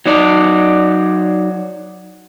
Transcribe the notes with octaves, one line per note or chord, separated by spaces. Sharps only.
F#3 D#4 D5